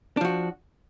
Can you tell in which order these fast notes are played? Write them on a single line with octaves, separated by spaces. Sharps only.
D4 F3 F#4